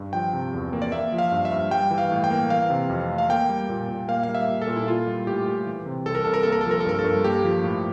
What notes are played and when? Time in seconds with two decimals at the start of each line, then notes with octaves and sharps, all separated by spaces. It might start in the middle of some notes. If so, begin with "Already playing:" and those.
Already playing: G2
0.13 F3 G5
0.33 C3
0.53 E2
0.73 A#3
0.82 D5
0.92 A#3 E5
1.12 F3
1.18 F5
1.32 G2
1.45 E5
1.52 G2
1.71 G3 G5
1.91 E3
1.98 F5
2.11 A2
2.24 G5
2.31 A#3
2.50 E3 F5
2.70 C3
2.90 F2
3.09 A3
3.18 F5
3.29 A#3 G5
3.49 G3
3.69 A#2
3.89 A#2
4.08 A#3 F5
4.23 G3 F5
4.35 E5
4.48 A#2
4.62 A4
4.67 A#2
4.76 E4
4.87 A#3 F4
5.07 G3
5.27 A2 G4
5.47 A2
5.67 E3
5.86 C3
6.06 C2 A4
6.15 A#4
6.25 C2 A4
6.34 A#4
6.43 A#3 A4
6.52 A#4
6.61 A4
6.66 F3
6.71 A#4
6.80 A4
6.85 G2 A#4
6.99 A4
7.04 G2
7.24 A#3 G4
7.44 F3
7.64 A2